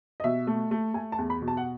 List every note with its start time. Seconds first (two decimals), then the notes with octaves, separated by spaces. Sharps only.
0.20 D#5
0.24 B2 E5
0.47 A3
0.71 A3
0.94 A3 G#5
1.12 A5
1.18 E2
1.30 B5
1.42 B2
1.48 A5
1.57 F#5